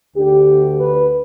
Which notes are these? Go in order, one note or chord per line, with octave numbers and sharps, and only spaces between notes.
D2 D3 G4
B4